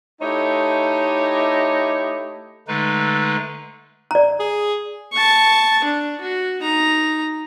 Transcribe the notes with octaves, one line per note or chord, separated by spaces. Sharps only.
A3 D#4 E4 G4 C#5 D#5
D3 G#3 A3 D#4 B4
D5 A#5
G#4
A5 C#6
D4
F#4
D#4 A#5